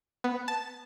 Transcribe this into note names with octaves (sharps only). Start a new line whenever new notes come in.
B3
A5